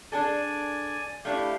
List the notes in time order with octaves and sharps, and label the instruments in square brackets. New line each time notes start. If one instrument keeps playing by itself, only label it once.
[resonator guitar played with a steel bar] D4 G#4 A4 [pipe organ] D5 G#5
[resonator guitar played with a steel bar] A3 D4 E4 [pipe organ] G4 F5